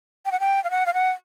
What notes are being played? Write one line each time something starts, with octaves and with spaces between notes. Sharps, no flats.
G5
F#5
G5
F5
F#5
F5
F#5